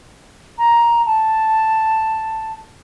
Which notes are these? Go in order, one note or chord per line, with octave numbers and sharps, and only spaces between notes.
A#5
A5